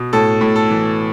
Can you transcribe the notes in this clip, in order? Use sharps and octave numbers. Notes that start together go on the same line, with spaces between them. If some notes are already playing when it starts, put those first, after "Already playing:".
Already playing: B2
A2 A4
A2
A4
E3